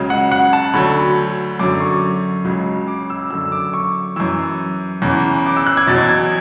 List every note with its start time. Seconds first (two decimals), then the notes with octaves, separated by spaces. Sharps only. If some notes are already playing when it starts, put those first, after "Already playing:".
Already playing: C#2 C#3 F#3
0.10 F#5
0.32 F#5
0.53 A5
0.73 D2 D3 F#3 B5
1.60 F#2 D3 F#3 D6
1.80 C#6
2.45 C#2 C#3 F#3
2.88 D6
3.10 E6
3.30 F#2 D3 F#3 E6
3.52 D6
3.73 C#6
4.16 F#2 E3 E6
5.02 E2 C#3 E3
5.46 D6
5.57 E6
5.67 F#6
5.77 G#6
5.87 E2 B2 F#3 A6
6.09 G#6